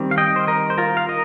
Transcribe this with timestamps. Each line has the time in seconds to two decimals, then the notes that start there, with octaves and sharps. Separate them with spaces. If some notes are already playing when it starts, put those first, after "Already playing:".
Already playing: D#3 G3 C4
0.11 F5
0.18 D#5 G5
0.36 C5
0.47 A#4 D#5
0.70 C5
0.78 F4 A#4
0.97 F5
1.09 A#4 D#5